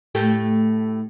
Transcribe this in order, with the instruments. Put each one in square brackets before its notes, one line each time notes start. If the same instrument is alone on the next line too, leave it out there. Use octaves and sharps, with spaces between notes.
[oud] A2 A3 G4